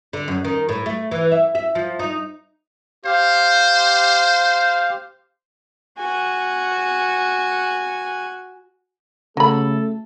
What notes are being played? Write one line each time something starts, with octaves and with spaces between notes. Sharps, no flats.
D3
F#2
D#3
A2
A3
E3
E5
E5
F3
D#4
G4 C5 F5
F#4 G#5
C#3 F#3 A3 A4 B5